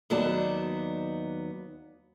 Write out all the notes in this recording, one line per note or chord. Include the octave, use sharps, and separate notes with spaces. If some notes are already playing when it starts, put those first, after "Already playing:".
D#2 F#3 B3 D#4 D5 A5